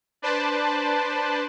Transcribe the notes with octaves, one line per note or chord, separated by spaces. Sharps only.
D4 B4 C5 D5 A5